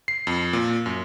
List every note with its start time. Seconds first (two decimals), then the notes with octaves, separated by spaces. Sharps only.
0.08 C7
0.27 F2
0.53 A#2
0.86 F#2